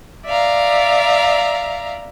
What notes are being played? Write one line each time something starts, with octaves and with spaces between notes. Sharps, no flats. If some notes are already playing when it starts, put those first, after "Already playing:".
D5 E5 F5 A#5